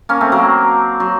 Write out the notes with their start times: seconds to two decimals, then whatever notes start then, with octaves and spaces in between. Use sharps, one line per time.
0.09 A#3 C#4
0.21 A3 C4
0.32 F#3 A#3
1.00 F#3